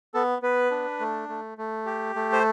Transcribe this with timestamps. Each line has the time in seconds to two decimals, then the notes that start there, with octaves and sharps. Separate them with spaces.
0.14 B3 A4
0.42 B3 B4
0.71 D4
1.00 A3
1.29 A3
1.58 A3
1.86 G4
2.16 A3
2.33 C5